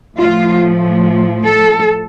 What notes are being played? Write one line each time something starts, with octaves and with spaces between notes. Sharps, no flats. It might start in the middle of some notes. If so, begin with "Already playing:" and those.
A2 F3 A3 F4
A4